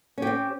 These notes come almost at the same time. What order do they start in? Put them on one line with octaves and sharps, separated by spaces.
C#4 G4 C4